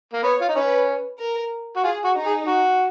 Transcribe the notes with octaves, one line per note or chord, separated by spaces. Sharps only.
A#3
B3 C#5
F4
D#4
C#4 B4
A#4
F#4
F4 G#4
F#4
D#4
G#4
F#4